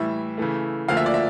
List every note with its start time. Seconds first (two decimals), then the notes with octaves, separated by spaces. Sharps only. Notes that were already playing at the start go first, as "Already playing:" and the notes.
Already playing: A2 E3 G3 E5
0.38 C#3 E3 A3
0.88 D2 D3 F3 A#3 F5
0.97 E5
1.06 D5
1.14 E5